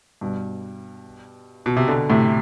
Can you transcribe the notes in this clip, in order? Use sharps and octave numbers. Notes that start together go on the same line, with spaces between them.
G2 B2
B2
C3
B2 D3
A2 C3